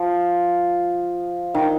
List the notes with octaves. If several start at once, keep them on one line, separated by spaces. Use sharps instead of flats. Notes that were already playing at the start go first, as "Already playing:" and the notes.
Already playing: F3
D#3